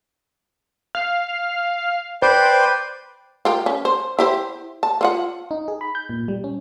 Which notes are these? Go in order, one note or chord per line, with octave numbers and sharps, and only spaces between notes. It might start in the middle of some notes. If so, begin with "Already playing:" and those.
F5
B4 C5 D5 G5
F4 G4 A#4
C#4
C5
E4 G4 C5
A5
C4 F4 F#5
D#4
G#4
B5
G6
A#2
G3
C#4